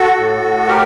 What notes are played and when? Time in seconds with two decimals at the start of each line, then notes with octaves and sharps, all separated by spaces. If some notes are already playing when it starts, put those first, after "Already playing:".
Already playing: F#4 A4
0.17 A2
0.43 A2
0.68 G4 A#4